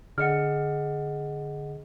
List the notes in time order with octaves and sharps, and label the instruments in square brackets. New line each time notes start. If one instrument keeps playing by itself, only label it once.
[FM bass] D3 [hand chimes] G#4 D#5 F#5 [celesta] F6 C#7